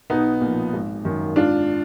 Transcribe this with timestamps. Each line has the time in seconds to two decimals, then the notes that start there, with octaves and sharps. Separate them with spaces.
0.10 B1 B3 D#4
0.41 A#2 F3
0.73 G#1
1.05 F#2 D#3
1.36 G#1 D4 F4